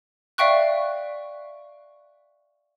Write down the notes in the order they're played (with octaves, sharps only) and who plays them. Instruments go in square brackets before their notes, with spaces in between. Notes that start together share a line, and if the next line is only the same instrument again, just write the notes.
[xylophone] D5 E5 F5 G5 C#6 F#6